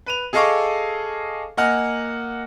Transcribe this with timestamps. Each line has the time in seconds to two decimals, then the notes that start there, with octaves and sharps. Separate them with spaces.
0.06 B4 D#7 F7
0.33 G#4 A4 D#5 F5 C#6 D6
1.57 A#3 D#5 F#5 G#5 F6